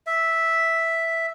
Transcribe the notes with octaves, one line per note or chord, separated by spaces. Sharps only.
E5